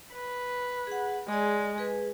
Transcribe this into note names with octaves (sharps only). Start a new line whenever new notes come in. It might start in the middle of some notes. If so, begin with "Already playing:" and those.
B4
G#4 F#5
G#3 G#4 D5
G#4 B4